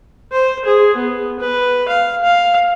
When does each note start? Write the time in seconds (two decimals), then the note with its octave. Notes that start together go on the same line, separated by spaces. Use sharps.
0.32 C5
0.65 G#4
0.96 B3
1.40 B4
1.89 F5
2.24 F5